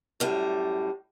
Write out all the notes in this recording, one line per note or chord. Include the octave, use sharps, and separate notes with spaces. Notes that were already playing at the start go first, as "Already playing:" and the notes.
F#2 A2 G3